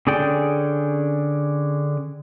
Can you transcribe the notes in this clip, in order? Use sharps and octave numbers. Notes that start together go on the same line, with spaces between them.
D3 C#4 G#4 D5 G5